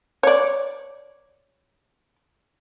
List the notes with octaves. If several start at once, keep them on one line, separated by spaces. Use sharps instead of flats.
C#5 D5